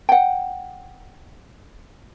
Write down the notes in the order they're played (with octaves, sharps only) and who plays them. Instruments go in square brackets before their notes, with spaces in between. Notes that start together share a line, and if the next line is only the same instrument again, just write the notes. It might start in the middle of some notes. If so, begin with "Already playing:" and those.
[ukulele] F#5 G5